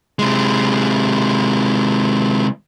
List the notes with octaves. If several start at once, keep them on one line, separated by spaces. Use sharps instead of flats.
C3 G#3